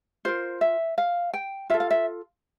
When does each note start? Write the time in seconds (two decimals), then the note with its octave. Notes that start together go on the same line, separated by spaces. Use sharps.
0.25 F4 A#4 C5
0.61 E5
0.98 F5
1.34 G5
1.70 F4 A4 E5
1.80 F5
1.91 E5